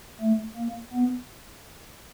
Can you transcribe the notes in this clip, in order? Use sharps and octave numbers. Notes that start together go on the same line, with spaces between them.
A3
A#3
B3